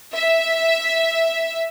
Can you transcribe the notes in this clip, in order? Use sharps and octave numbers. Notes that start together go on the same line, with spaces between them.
E5